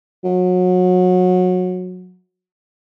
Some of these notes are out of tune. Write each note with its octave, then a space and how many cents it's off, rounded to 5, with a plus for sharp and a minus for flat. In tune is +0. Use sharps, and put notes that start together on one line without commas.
F#3 -25